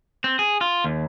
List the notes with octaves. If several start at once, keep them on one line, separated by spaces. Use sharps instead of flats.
C4
G#4
F4
D#2